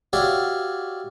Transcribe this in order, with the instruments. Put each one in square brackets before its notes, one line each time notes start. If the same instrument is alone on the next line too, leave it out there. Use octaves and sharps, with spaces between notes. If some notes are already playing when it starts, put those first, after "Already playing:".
[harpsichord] F#4 G4 C#5 D5 E5 F5